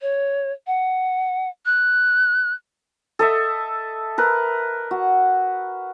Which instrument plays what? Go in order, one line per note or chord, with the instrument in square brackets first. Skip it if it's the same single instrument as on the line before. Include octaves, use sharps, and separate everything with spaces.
[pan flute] C#5
F#5
F#6
[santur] A4 D#5 E5
A#4 B4
F#4